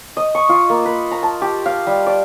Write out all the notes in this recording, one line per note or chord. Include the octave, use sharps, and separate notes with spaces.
D#5
C#6
F4
A#3
B4
A#5
A5
G4
F5
G3
D5